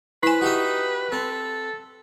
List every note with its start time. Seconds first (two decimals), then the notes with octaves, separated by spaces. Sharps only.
0.23 E4 B4 C5 G#5 B5
0.41 D#4 F#4 G4 E5
1.12 C4 A4